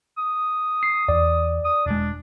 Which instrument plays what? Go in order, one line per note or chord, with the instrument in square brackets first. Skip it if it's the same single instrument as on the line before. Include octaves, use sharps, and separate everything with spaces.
[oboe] D#6
[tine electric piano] C7
[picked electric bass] E2 [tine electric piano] D5
[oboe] D#6
[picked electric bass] E1 G#3 [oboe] D4